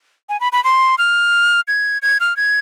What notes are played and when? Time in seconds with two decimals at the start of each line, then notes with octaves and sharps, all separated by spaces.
0.29 G#5
0.40 B5
0.52 B5
0.64 C6
0.98 F6
1.68 G#6
2.02 G#6
2.20 F6
2.37 G#6